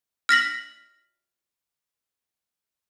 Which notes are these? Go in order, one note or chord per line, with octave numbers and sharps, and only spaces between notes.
F6 A#6 B6 F#7